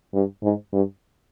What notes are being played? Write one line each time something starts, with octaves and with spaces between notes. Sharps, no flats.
G2
G#2
G2